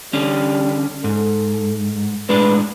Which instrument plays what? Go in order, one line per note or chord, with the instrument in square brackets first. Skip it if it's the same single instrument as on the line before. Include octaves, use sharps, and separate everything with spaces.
[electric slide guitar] D3 C#4 [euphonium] G3
[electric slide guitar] G#2 [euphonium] A4
[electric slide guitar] A2 G#3 D4 [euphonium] B4